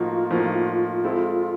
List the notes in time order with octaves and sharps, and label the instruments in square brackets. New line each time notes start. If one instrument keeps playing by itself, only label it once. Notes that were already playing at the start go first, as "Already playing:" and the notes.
Already playing: [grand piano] A2 F3 A#3 D#4 F#4 [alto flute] F4
[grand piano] A2 F3 A#3 D#4 F#4
G#3 C4 E4 A4